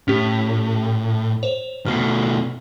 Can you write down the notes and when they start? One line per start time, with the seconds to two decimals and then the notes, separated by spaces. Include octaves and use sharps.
0.08 A2 C#4 G4
1.43 C5 C#5
1.86 B2 A3 F6 C7